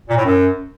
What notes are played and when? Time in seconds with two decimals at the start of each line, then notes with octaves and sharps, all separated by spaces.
0.09 A#2
0.17 A2
0.25 F#2